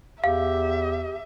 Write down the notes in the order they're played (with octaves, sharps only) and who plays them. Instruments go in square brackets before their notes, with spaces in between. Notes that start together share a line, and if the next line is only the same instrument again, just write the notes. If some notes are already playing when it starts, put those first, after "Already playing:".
[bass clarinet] E2 [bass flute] G4 [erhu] E5 [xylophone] F5